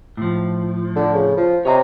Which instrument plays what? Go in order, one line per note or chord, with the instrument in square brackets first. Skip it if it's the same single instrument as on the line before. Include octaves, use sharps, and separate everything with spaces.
[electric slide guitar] A2 F3
[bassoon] D3
C#3
F3
[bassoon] C3 [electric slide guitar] C#5 D#5 A#5